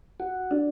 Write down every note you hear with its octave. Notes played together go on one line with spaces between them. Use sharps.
F#4
D4